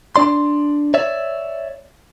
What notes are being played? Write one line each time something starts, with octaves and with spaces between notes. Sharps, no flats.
D4 D5 C6
C#5 D5 E5